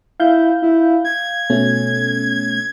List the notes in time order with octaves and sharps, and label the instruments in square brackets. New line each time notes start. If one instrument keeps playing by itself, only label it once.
[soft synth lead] E4 [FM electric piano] F5 G6
[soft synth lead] E4
G#6
[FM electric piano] B2 A3 C#4